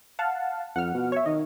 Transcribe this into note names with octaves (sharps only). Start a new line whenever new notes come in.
F5 F#5 A5
F2 F#5 F6
B2
C#5 E5
D#3 D#5